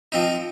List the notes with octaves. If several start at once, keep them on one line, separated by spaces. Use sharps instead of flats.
F3 C4 D#4